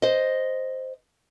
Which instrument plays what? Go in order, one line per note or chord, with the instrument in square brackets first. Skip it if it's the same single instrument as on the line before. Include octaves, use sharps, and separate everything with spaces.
[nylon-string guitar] C5 D#5